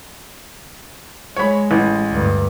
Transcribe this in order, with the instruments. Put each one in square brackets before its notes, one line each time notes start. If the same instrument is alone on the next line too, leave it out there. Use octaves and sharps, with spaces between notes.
[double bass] G#3 [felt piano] C#5 B5
[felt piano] A1
[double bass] D2 G2